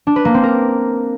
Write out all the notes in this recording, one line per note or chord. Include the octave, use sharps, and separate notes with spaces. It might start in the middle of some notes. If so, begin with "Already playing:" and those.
D4
B4
A#3
C4
A#4